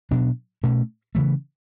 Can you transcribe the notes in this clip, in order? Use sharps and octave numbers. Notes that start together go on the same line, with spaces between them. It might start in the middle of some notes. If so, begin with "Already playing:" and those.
B2 F#3 B3 D4
B2 A3 C#4
C#3 E3 A3